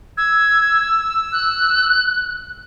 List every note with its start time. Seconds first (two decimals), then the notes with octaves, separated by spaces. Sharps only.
0.17 E6 G#6
1.32 F#6